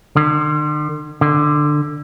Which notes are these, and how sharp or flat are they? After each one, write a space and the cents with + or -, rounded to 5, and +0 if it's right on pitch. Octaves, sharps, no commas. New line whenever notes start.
D3 +45
D3 +15